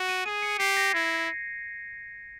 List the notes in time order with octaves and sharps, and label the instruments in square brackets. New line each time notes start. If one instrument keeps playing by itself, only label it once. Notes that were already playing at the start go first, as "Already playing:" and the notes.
Already playing: [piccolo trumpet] F#4
[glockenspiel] D#7
[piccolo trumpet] G#4 [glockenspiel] D#7
[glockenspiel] C#7
[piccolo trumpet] G4 [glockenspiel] C7
[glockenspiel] A#6
[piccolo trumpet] E4 [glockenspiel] G#6